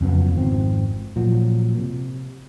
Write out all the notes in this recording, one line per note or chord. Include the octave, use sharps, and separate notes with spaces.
F2 C#3 F#3 B3
G#1 F2 C4
A#2 F3 F#3
C3